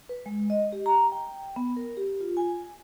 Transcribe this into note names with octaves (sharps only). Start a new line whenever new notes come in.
B4
G#3
D#5
G4
A#5
G5
B3
A#4
G4
F4
G#5